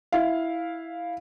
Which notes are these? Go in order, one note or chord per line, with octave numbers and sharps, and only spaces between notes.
E4 F5